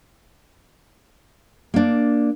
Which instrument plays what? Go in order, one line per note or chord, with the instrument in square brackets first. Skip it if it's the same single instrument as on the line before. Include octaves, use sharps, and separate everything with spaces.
[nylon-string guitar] A#3 D4